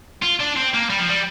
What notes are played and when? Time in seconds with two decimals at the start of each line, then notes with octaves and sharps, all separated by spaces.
0.23 F4
0.40 D4
0.57 C4
0.74 A#3
0.90 G3
0.99 F3
1.08 G3